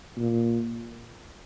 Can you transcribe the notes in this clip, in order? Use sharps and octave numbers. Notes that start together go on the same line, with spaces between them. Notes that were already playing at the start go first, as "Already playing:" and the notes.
A#2